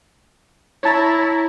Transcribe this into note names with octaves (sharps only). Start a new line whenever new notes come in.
E4 C#5 A5 A#5